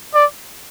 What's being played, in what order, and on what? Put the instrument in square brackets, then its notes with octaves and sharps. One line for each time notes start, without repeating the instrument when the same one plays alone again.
[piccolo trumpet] D5